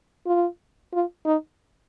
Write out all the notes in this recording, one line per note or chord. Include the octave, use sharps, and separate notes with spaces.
F4
F4
D#4